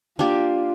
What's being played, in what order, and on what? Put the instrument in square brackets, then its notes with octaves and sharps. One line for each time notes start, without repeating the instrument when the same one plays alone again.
[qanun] A#3 D4 G4 [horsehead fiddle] F4